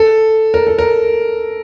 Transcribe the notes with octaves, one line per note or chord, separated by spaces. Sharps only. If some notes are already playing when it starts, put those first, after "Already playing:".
Already playing: A4
A#4
A4
A#4